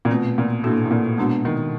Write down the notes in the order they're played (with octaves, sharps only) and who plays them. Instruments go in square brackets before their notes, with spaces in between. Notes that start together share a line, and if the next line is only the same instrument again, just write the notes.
[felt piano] A#2
[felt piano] B2 [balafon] A3 C4 F4
[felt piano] A#2
[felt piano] A2 [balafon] A#3 D4 F#4
[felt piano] A2
A#2
[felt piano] B2 [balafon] G#3 B3 D4 F#4
[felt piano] D#3